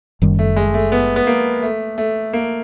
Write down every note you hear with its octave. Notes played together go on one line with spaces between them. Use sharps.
F#1 F#2 D#3 G3
A3
G#3
A3
B3
B3
A#3
A3
A3
A#3